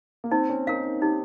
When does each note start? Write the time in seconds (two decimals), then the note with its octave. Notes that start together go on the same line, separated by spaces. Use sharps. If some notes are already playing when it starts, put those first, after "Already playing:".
0.24 A#3
0.31 C4 D#4
0.49 C#4
0.67 D#4 A#4 F5
1.02 D#4 G4